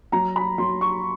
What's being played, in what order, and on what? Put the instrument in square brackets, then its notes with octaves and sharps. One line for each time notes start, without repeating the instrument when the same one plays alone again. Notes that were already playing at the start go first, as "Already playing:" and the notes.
[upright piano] F#3 A#5
B5
F#3 C6
C#6